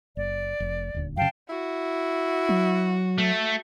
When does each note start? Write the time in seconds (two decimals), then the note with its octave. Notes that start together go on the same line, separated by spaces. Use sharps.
0.17 F#1 D5
0.60 F1
0.94 D#1 D2
1.17 F#2 C#3 F5 G5 A5
1.49 E4 F#4
2.49 F#3
3.18 A3